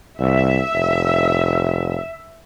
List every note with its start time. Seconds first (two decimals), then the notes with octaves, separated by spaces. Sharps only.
0.20 C2 E5
0.74 F1